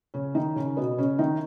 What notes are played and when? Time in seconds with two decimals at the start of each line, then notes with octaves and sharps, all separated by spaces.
0.14 C#3 C#4
0.35 D#3 D#4
0.56 C#3 C#4
0.77 B2 B3
0.98 C#3 C#4
1.19 D#3 D#4